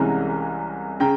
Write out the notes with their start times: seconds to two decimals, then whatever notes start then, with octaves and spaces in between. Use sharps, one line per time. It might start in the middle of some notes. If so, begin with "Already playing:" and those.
Already playing: C2 C3 E3 G#3 C#4 A#5
1.00 C#3 G5 A#5